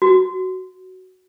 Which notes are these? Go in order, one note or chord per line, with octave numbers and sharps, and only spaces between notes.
F#4